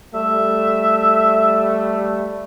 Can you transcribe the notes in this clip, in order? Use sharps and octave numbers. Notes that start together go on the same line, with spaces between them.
G3 A3 E5